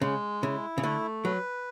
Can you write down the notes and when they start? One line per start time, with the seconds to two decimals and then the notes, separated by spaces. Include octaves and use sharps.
0.01 C#3 G#3
0.42 C#3 E4
0.78 C#3
0.83 D3 A3
1.25 F#3 B4